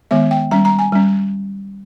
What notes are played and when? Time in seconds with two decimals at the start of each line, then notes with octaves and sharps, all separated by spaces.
0.11 D#3 G#3 B3 E5
0.31 G5
0.51 G3 C#4 A#5
0.65 A#5
0.79 G#5
0.92 G3 C#4